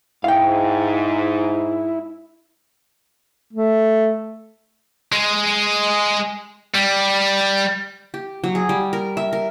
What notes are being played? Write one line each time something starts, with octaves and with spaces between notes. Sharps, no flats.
G#2 E4 F5 G5
A3
G#3 G#4
G3
G4
F#3
G#4
G3
A#4
E5
A#4